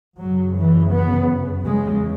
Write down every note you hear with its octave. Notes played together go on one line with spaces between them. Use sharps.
F#2 C#3 F#3
E3
B3
E2 C#3 G#3